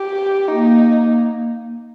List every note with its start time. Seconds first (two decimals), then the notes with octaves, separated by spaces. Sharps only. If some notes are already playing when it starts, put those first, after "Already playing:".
Already playing: G4
0.48 A#3 D#4